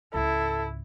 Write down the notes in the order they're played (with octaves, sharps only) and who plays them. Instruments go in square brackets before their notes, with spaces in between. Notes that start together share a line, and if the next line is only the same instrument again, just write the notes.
[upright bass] C#2 G#2 [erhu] E4 [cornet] A4